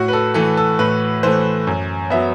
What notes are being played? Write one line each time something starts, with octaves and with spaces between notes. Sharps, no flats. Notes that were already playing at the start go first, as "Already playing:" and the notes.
Already playing: A2 F#4
B4
A4
E3 A3 A4
A4
A2 B4
E3 A3 C5
F#2
F#3 B3 E5